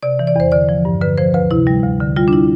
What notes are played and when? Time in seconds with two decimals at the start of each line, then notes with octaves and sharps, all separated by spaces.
0.03 C3 D5
0.19 E3
0.27 D5
0.36 E2 C5
0.52 D3 D5
0.69 F3
0.85 G2
1.02 D3 B4
1.18 F3 C5
1.34 D2 B4
1.51 C3 E4
1.67 G3
1.83 D2
2.00 D3
2.16 G3 F4
2.28 D4
2.33 E4